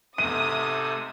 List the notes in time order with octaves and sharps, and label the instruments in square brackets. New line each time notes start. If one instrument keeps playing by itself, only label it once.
[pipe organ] G#2 C3 A3 [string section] D#6 [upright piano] D#7